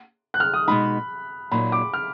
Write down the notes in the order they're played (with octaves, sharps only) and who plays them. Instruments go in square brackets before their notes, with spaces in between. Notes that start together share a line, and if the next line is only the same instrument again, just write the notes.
[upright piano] F#6
F6
D#6
[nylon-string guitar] B2 G#3 D#4 [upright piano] B5
[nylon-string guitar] A#2 F#3 A#3 D#4 [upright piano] B5
[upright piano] D6
F6